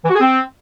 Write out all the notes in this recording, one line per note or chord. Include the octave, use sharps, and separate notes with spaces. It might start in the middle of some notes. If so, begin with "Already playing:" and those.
E3
F#4
G#4
C4